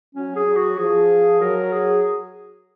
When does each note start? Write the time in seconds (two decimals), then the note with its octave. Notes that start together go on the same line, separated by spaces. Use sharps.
0.14 F#3 C#4
0.36 G#4
0.46 F#3
0.56 F#4
0.77 F3 G#4
1.40 F#3 A#4
1.72 G#4